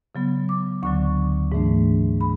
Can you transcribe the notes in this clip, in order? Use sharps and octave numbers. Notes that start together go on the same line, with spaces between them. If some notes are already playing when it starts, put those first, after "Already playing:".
C#3 F#3 B3
D6
D2 D3 F#3 C#6
G#2 E3 A3 D4
B5